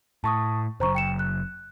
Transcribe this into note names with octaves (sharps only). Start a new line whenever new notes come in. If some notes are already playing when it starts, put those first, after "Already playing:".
A2 A5 C#6 D#6
F#1 F#2 C5 A#5 C#6
G5 C#7 E7
F#6